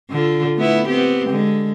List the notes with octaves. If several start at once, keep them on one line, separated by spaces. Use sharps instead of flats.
D3 F4
A3 B3 E4
B3 C4 G4
D3 G#3